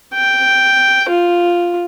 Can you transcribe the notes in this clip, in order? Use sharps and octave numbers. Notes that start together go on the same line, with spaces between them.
G5
F4